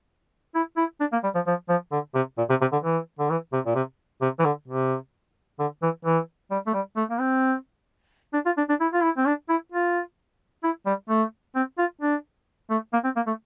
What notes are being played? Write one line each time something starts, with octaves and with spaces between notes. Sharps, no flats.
E4
E4
D4
A#3
G3
F3
F3
F3
D3
C3
A#2
C3
C3
D3
E3
D3
E3
C3
A#2
C3
C3
E3
D3
C3
D3
E3
E3
G3
A3
G3
A3
A#3
C4
D4
F4
D4
D4
E4
F4
E4
C4
D4
E4
F4
E4
G3
A3
C4
F4
D4
A3
A#3
C4
A#3
A3